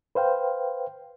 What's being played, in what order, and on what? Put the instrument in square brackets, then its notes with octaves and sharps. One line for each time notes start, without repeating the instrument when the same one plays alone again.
[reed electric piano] B4 C5 F5 G5